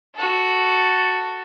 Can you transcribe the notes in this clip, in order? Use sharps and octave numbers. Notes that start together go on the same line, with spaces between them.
F#4 A4